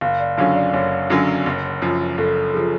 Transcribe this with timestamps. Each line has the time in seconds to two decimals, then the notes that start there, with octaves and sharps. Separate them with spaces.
0.01 F#1 F5
0.20 D5
0.37 F#2 D3 F#3 C#4 F5
0.56 D5
0.74 F#1 C#5
1.10 F#2 D3 F#3 C#4
1.46 F#1
1.82 F#2 F3
2.18 F#1 A4
2.54 F3 G#4